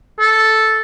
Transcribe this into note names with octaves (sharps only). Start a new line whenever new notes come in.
A4